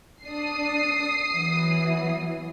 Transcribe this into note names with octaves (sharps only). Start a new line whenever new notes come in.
D4 D#6 C7
E3 F#3 B3